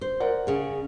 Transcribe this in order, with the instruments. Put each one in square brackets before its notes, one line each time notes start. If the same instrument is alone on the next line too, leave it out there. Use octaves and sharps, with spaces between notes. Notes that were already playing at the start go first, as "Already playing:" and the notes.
[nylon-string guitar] C5
[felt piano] A#4 D5 F#5
[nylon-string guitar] C#3 G#4